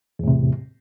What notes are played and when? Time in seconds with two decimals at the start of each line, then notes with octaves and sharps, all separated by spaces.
0.19 E2
0.23 A2
0.28 C3